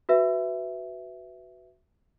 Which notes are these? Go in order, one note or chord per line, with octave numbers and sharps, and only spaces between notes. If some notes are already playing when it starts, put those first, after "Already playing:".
F#4 B4 E5